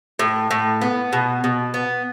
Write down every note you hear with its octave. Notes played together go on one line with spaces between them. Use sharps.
A2
A2
B3
B2
B2
B3